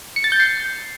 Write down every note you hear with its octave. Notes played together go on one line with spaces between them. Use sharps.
C#7
A6
G6
C7